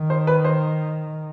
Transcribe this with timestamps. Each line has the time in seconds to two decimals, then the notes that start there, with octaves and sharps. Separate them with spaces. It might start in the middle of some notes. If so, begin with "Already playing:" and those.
Already playing: D#3
0.10 C5
0.27 B4
0.45 C5